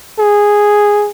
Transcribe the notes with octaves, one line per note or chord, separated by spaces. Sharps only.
G#4